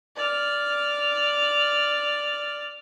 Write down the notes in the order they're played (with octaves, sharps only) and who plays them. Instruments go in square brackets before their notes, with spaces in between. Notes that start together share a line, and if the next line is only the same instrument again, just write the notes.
[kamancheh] D5 F6